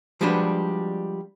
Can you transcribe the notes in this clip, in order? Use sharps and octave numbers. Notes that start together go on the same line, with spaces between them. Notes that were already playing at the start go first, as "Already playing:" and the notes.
F3 G3 G#3 D4 F#4 B4